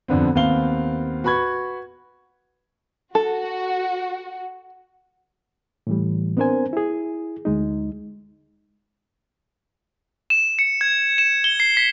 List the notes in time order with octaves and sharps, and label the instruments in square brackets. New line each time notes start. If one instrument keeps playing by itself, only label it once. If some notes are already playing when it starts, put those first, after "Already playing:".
[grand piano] F2 D3 B3 C4
D#2 B3 C4 F5 G7
F#4 B4 B5 C#6 G#6
[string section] F#4 [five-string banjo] A4
[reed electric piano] A2 E3 G3
B3 C4 D4 A#4 C5 G#5
E4 G#4
D2 G#3 D#4
[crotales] E7
C#7
G#6
E7
G7
C7
B6